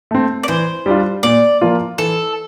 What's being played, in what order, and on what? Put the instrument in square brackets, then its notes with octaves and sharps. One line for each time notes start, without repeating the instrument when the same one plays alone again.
[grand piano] A3 C4
[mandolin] D5
[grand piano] E3 [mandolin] C5
[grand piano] G3 D4 F4
[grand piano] A#2 [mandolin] D5
[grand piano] F3 A#3 F4
[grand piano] E3 [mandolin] A4